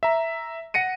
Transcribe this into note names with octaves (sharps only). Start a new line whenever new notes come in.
E5 A#5
F#5 A#6 C#7 D#7